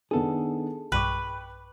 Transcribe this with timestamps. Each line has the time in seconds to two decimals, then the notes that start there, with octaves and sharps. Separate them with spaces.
0.11 D#3 B3 D4 G#4 A4
0.92 B1 G2 B4 G5 C#6 D6